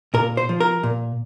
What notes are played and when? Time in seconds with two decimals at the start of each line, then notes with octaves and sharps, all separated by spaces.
0.14 A#2 A#4
0.37 C5
0.49 F3
0.60 A#4
0.83 A#2